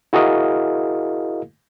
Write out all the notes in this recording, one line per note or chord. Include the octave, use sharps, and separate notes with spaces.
E4 F#4 G#4 A#4 D#5 F5